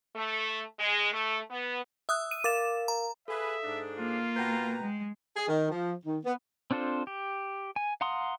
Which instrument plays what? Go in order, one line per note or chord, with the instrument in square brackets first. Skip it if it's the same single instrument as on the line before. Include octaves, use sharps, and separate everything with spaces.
[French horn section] A3
G#3
A3
B3
[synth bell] E5 D#6 F#6 [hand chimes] E6
[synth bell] D#7
[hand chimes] A#4 F5 [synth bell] D6 A6 E7
[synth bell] A#5
[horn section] G#4 B4 [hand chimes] A4 F5 D#6 [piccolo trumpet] E5
[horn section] G#2 D4
[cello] A#3 [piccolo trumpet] F4
[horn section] B2 B4 A#5 [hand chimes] F#5 G5 G6
[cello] G#3
[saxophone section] G#4
D#3
F3
D#3
B3
[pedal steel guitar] C4 D4 F4 A4 C5
G4
G#5
F5 F#5 A#5 C6 D#6